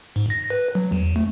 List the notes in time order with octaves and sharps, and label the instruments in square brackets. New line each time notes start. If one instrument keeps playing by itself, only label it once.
[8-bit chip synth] G#2
A#6
B4
F#3
E2
A3